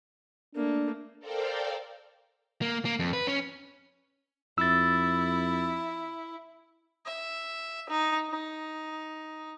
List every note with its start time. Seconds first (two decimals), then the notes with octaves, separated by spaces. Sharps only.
0.56 A3 A#3 D4
1.19 A4 A#4 C5 D5 F5 G5
2.62 A#3
2.85 A#3
2.99 F2
3.13 B4
3.27 C#4
4.58 F2 E4 E6 A6
7.06 E5
7.89 D#4
8.29 D#4